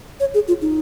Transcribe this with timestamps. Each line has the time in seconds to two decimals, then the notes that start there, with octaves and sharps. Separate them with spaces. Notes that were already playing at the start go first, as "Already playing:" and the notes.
0.20 C#5
0.34 G#4
0.48 F4
0.62 D#4